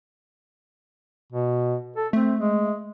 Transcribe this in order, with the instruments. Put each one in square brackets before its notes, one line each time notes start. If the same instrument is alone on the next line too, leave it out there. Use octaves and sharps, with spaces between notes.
[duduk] B2
A4
[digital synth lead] A3 [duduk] C4
[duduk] G#3